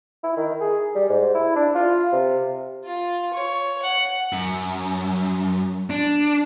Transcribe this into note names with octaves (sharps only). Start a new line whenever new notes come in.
E4
D#3
G#4
G3
G#2
E4
D4
F4
C3
F4
C#5
F#5
F#2
D4